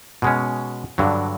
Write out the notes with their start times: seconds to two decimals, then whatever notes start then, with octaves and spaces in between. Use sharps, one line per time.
0.22 B2 G#3 C#4
0.98 G2 D3 F#3